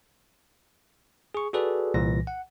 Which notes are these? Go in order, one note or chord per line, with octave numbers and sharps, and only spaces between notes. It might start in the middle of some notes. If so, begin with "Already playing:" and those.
G#4 C#6
F#4 G#4 A4 B4 D5
C2 A#2 E3 A#6
F#5